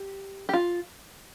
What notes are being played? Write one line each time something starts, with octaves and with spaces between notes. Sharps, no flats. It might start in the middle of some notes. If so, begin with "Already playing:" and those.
Already playing: G4
G4
F4